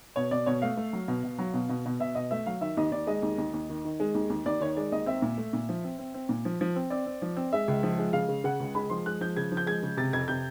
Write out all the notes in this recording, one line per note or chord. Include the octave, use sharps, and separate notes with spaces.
B2 C#5
B2 D5
B2 C#5
A3 F5
A3
F#3
B2
B2
F#3
B2
B2
B2
B2 E5
B2 D#5
A3 E5
F#3 F5
D#3 E5
D#2 D#5
D#2 D5
G#3 D#5
D#2
D#2
D#2
D#3
D#3
G#3
D#2
D#2
D#2 D5
D#3 C#5
G#3 D5
D#2 D#5
C4 E5
A#2
A3
A#2
F3
C4
C4
C4
A#2
F3
F3
C4
C4 D5
C4
F3
C4
G#3 E5
C#2
F3
G#3
C#3 F5
C#3
C#3 F#5
C#2
G#3 B5
F3 C6
G#3 F#6
F3 G6
C#3 G#6
F3
G6
G#3 G#6
C#3
C3 A6
F2 G#6
C3 G6